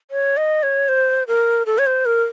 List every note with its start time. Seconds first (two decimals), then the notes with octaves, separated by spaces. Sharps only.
0.11 C#5
0.37 D#5
0.63 C#5
0.89 C5
1.28 A#4
1.66 A4
1.78 C#5
1.86 C5
2.06 A#4